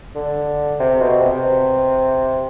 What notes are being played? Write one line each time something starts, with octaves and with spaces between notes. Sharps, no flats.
D3
C3
B2
C3